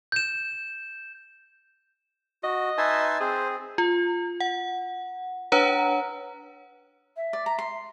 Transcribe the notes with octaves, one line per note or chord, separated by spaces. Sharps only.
G6 E7
F#4 D#5
D#4 B4 E5 G#5 A5 C6
C4 G#4 C5
F4
F#5
D4 B4 C#5 F#5 A#5
E5
D5
A#5
C6